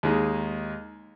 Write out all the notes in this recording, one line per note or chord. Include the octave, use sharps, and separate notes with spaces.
D#2 G#3 D#4